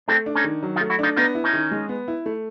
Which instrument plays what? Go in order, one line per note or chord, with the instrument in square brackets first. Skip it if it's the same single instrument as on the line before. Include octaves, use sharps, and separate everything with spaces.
[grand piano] A3 [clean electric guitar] C4 D4
[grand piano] D4
[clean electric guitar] C#4 D#4
[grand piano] D#3
F#3
[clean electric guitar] D#4 F4
[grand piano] A3
[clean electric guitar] E4 F#4
[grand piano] D4 [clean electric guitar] D#4 F4
[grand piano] B3 [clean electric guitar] D#4 F4
[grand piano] E4
[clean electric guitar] C#4 D#4
[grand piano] D#3
G#3
B3
E4
A3